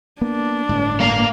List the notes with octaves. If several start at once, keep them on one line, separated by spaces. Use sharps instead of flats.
A#3 B3 D4
G1 A2 G#3
A#3 F5